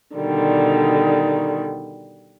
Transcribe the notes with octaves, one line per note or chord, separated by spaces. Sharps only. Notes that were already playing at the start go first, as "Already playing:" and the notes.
B2 D3 D#3 G3